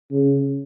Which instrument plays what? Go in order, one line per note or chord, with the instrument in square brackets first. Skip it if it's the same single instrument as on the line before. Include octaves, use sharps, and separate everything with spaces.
[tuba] C#3